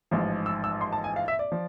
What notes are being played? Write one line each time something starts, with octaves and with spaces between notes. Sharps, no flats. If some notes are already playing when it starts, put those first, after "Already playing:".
A1 G#2 F3
E6
E6
C6
A5
G#5
F5
E5
D5
F3